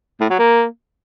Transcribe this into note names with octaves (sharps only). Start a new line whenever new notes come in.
A2
F#3
A#3